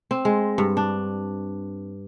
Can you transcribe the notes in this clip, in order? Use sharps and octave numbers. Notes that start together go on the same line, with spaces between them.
C4
G#3
G2
D4